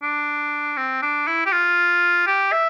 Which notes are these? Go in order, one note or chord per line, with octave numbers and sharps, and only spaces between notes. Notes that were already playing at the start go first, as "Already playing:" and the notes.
D4
C4
D4
E4
G4
F4
G4
E5